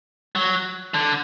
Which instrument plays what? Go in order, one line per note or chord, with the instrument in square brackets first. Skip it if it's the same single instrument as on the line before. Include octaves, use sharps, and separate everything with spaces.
[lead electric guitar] F#3
D3